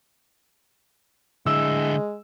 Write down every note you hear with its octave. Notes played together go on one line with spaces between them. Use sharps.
D3 G#3 E4 E6